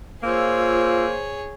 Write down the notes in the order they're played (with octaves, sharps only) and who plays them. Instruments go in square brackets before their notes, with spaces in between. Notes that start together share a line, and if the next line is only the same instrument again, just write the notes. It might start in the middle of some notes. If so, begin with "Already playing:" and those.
[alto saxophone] A#3 [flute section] F4 E6 [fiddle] G#4 C#5 [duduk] C5